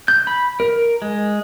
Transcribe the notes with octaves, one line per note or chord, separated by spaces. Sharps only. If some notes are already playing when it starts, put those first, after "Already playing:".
G6
B5
A#4
G#3